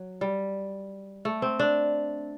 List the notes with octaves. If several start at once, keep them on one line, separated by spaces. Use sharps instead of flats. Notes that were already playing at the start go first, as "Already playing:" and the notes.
Already playing: F#3
G3
A3
C4
D4